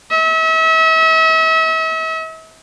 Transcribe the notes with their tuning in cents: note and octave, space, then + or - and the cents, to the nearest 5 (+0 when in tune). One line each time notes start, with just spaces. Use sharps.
E5 -40